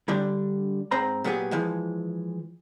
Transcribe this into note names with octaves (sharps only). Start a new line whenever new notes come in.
D3 G3 D4
G#2 C4 C5 A#5 B5
A#2 F#3 B3 G4 G#4
E3 F3 G#3